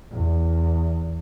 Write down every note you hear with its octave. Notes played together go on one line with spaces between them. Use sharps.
E2